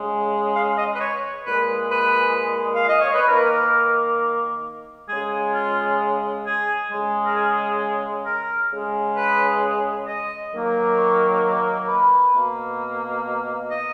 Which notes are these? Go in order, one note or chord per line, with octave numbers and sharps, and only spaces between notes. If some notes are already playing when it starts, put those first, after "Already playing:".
Already playing: C#3 G#3
F5
D#5
B4
C#5
A#2 G#3 B4
B4
F5
D#5
C#5
B4
D#3 A#3 A#4
C#3 G#3 G#4
F4
G#4
C#3 G#3
A#4
G#4
A#4
C#3 G#3
B4
D#5
D#3 F#3 A#3
C#5
B4
B2 A#3
D#5